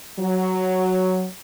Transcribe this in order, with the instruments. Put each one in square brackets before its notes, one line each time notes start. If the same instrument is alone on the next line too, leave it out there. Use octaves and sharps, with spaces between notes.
[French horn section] F#3